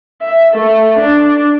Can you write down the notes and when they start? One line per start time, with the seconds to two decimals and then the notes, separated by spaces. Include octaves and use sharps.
0.22 E5
0.54 A3
0.98 D4